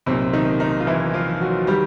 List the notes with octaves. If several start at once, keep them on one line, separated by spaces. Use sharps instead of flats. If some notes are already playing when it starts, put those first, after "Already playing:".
B1 A#2 C3 C4
D#3 D#4
D#3 D#4
F4
E3 E4
F3 F4
F#3 F#4
D#3 G3 G4